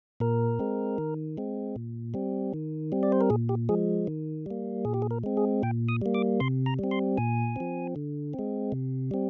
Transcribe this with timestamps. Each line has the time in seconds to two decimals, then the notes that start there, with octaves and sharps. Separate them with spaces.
0.20 A#2 A#4
0.59 G#3 C4
0.98 D#3
1.37 G#3 C4
1.76 A#2
2.14 G3 C4
2.54 D#3
2.92 G3 C4
3.03 D5
3.12 C5
3.21 A#4
3.30 A#2 G#4
3.49 G4
3.69 F3 G#3 G#4
4.07 D#3
4.46 G3 A#3
4.85 A#2 G#4
4.94 G4
5.02 G#4
5.11 A#4
5.24 G#3 C4
5.37 G#4
5.63 A#2 G5
5.89 D#6
6.02 G3 A#3
6.14 D6
6.40 C3 C6
6.66 A#5
6.79 G3 C4
6.91 C6
7.18 A#2 G#5
7.56 F3 C4
7.96 D3
8.33 C4
8.39 G#3
8.72 C3
9.11 G3 C4